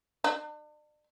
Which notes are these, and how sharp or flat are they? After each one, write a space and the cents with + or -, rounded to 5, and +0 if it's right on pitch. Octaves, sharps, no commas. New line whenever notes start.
D4 +40